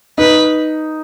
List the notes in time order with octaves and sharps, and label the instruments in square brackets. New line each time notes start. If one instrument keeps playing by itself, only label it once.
[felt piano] D#4 [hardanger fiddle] B4